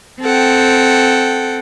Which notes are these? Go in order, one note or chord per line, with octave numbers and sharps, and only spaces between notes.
C4 A4 F#5 G5